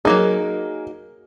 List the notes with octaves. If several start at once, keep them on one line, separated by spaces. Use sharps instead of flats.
F#3 A#3 D#4 G#4 A#4